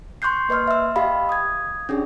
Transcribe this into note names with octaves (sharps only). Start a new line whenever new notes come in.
C6 C#6 F#6 G6 C7
A#3 B4 D#5 C6 F6
E5 E6
G4 D#5 F5 B5
D#6 G#6
C#4 D4 G4 G#4